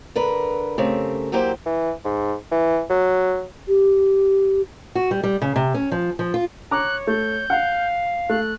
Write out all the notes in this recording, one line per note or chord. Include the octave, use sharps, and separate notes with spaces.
D3 A#4 B4
C#3 A3 C4 G4 A#4
F#3 A#3 E4 G4 C5
E3
G#2
E3
F#3
G4
F#4
G3
G3
C#3
C3
C#4
F3
F3
F4
C#5 A#5 D6 F#6
A3 G6
F5 F#5
A3 F#6